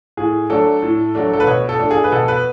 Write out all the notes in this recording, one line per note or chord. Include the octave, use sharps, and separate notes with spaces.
A2 G#4
F#3 A3 D4 A4
A2
F#3 A3 D4
A4
B4
B2 C#5
A4
A3 D4
G#4
B4
B2 A4
B4